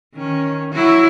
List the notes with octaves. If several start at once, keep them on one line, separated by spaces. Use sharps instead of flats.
D#3 C#4
F#3 E4 F#4